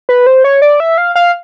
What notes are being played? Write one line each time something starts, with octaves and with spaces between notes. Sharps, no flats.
B4
C5
C#5
D5
E5
F5
F5